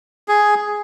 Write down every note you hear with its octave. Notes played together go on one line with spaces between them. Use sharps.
G#4